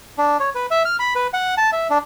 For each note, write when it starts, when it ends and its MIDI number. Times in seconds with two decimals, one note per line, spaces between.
0.18 0.37 62
0.40 0.50 73
0.55 0.66 71
0.71 0.83 76
0.85 0.96 89
0.99 1.14 83
1.16 1.27 71
1.33 1.55 78
1.57 1.70 81
1.72 1.87 76
1.90 1.98 62